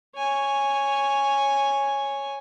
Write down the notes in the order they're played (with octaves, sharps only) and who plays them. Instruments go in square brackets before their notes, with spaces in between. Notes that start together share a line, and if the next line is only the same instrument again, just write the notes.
[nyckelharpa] C#5 G#5